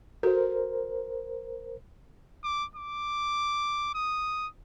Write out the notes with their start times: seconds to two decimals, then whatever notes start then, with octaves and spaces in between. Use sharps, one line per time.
0.23 F#4 A4 A#4 C5
2.44 D6
2.76 D6
3.95 D#6